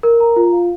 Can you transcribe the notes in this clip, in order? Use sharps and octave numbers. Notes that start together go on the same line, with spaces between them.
A#4
A#5
F4
F5